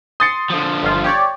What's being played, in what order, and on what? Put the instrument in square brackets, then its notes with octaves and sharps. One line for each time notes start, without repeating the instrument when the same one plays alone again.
[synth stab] C6 [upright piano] D#6 A6 C#7
[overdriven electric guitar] D3 F3
[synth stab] G1 F4
G4 C#5 D5